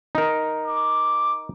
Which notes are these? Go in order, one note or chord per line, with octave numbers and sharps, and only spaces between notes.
D#4 A#4
D6